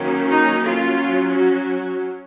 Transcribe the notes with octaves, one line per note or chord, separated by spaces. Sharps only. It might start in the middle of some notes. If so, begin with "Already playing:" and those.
Already playing: D#3 F#3 A#3 C#4
D#4
F#3 C#4 F4
F#4